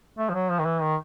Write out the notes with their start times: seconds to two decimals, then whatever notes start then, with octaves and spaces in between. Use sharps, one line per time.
0.19 A3
0.29 F3
0.34 F#3
0.49 F3
0.59 D#3
0.65 E3
0.81 D#3